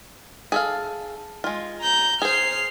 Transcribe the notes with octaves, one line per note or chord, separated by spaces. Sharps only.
G#4 A4 F5
G#3 F4
A#5 G6
G#4 C5 F6 C7